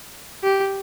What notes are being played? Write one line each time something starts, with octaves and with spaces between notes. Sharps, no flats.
G4